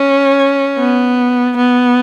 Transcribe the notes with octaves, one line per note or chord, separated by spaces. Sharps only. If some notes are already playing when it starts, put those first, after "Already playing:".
Already playing: C#4
B3
B3